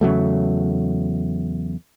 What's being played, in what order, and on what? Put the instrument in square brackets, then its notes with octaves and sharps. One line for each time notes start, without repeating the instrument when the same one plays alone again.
[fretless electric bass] E2 C#3 F#3 A3